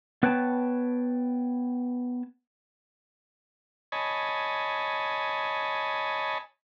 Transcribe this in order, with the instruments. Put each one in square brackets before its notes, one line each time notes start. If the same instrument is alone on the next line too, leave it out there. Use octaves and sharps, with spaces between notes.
[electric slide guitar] B3 B4 C#5 G5 A5
[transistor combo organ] C#5 D#5 G#5 A5 B5